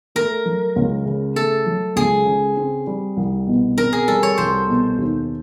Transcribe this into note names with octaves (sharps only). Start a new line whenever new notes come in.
A3 A#4
F#3
C#2
C#3
A3 A4
F#3
C#2 G#4
C#3
C4
G3
C2
B2
C4 A#4
G#4
G3 A4
C#5
C2 C5
B2
D#2